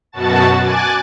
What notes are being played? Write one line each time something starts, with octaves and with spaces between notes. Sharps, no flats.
F#2 B2 F#4 A5 A6
G#5 D6 F#6 A6